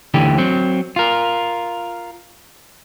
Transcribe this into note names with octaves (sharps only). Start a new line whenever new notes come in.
D2 D3 E3 G4
F#3 C4
F4 A#4